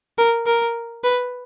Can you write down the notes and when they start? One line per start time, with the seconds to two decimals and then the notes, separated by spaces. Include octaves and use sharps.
0.18 A#4
0.47 A#4
1.04 B4